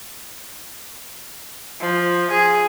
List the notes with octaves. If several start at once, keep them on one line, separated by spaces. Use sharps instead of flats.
F3
G#4